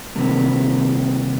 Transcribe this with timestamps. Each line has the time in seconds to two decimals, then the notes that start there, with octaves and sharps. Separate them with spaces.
0.16 C3 D#3 G3 A#3